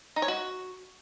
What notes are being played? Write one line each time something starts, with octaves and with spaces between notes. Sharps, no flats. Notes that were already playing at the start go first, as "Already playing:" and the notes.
D#4
C#5
F#4